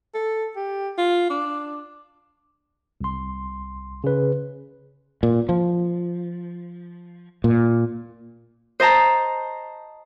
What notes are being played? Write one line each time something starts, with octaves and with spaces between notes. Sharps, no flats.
A4
G4
F4
D4
C2 C6
C#3 B4
A#2
F3
A#2
C5 D#5 A5 A#5